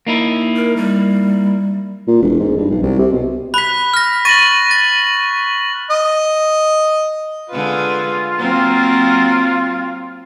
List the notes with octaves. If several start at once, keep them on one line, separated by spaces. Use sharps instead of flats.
A#3 D#4 E4
A#4
G3
A#2
E1
G#2
G2
B1
C2
C3
B2
B5 F#6 B6
F6 A#6
C#6 A6 A#6 D#7 F#7
A6
D#5
D3 G#3 F4 B4
F#3 A#3 C4